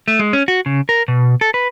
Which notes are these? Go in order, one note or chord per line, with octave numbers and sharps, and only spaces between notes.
A3
G#3
C#4
F#4
C#3
A#4
B2
A4
B4